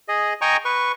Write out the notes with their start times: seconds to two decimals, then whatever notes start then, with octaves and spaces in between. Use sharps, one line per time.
0.08 G#4 D#5
0.41 D#5 G5 G#5 A#5 C#6
0.65 B4 C#6